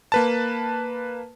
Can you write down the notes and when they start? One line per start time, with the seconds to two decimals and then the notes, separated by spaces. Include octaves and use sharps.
0.12 A#3 B4 A5